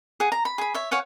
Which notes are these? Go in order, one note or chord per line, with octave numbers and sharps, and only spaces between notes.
G#4 F#5
A#5
B5
G#4 B5
C#5 E5
C#5 F5 F#5 G#5